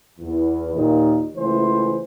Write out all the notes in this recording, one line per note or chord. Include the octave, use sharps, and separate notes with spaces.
E2
D#2 A#2 D#4
C#2 E3 A3 C5